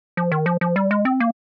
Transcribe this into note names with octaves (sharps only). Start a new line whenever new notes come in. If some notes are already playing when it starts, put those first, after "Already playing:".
F3
D#3
F3
F3
G3
G#3
C4
A#3